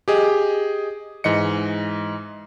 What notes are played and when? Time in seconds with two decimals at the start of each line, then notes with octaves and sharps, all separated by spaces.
0.08 G4 G#4 D#5
1.24 G#2 E3 D#5 C#7